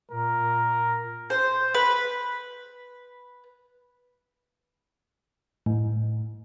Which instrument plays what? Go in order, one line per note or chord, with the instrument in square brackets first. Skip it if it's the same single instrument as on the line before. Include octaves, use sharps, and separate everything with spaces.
[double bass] A#2 [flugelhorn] A#4
[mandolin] C5
B4
[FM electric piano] A2